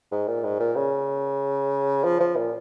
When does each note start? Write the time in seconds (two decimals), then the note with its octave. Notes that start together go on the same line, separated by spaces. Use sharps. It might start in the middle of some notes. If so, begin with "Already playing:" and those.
0.12 G#2
0.28 A#2
0.44 G#2
0.59 A#2
0.76 C#3
2.04 F3
2.20 F3
2.36 A#2